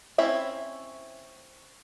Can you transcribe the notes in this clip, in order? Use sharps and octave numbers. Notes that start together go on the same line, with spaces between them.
C4 C#4 E4 E5